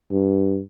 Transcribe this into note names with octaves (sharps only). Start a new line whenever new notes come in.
G2